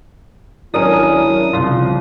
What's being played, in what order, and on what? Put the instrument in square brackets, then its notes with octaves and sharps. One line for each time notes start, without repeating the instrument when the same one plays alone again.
[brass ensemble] G#1 E4 [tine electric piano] F#3 C#4 [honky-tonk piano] D4 A#4 D#7 [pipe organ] D#6
[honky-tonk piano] C2 [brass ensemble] C#3 F3 [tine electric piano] F4